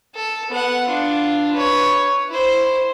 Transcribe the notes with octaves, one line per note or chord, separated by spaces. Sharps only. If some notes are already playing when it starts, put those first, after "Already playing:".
A4
B3 F#5
D4 F4
B4 C#5
E4 C5